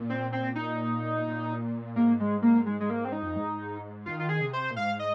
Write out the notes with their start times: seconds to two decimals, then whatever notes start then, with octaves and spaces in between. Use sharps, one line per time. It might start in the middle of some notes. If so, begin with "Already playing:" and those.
Already playing: A#2
0.10 C4
0.32 C4
0.55 D#4
1.27 A#2
1.96 G#2 A#3
2.20 G#3
2.42 A#3
2.66 G#3
2.80 G#3
2.90 A#3
3.05 C4
3.12 D#4
3.22 F2
3.36 G#2
4.06 D#3 F4
4.20 F4
4.29 G#4
4.41 C3
4.53 C5
4.70 A#2
4.76 G#2 F5
4.99 D#5